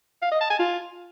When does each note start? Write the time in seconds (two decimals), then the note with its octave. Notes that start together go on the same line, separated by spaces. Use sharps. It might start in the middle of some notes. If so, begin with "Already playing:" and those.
0.22 F5
0.32 D#5
0.41 A5
0.50 G#5
0.60 F4